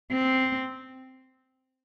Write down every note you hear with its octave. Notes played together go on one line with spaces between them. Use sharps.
C4